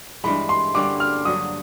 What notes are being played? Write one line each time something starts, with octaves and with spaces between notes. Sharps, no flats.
G2 E3 G#3 B5
C6
D3 G3 A#3 C#4 D6
F6
G2 D3 F#3 D#6